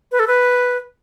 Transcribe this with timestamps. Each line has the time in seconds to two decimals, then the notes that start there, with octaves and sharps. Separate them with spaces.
0.12 B4
0.19 A4
0.28 B4